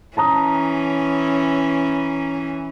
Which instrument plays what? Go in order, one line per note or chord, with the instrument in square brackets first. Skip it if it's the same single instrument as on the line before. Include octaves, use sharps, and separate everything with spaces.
[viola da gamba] E3 C#4 [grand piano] A5 A#5 D#6